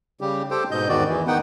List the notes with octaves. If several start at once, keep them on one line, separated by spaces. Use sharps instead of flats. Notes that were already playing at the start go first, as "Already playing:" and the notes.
C#3 G3 G4
G4 A4 C5 G5
G#2 B2 D#5 G6
E2 G#2 D#3 F#4 D5
E2 E3
D#3 B3 D#4 F#5 G5